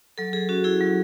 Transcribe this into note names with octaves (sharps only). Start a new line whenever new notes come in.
F#3 A4
F#3 G#4
C#4 F#4
E4 G#4
F#3